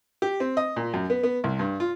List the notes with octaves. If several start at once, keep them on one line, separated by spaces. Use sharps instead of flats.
G4
C4
D#5
A#2
F#2
B3
B3
C2
G2
F4